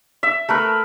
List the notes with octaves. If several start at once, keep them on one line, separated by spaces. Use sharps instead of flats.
E5
A3 A#4 B4